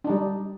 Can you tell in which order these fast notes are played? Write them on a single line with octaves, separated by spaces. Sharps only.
D4 D#4 G3